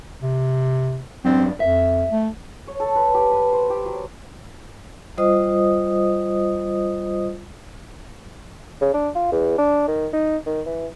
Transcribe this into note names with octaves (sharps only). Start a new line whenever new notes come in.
C3
F#2 C4 D4
F2 E5
A3
C#5
A4
B4
G4
B4
C5
G4
F#3
G3 F4 C5 D#5 D#6
C#3
D4
F4
E2
D4
D#3
D#4
D#3
E3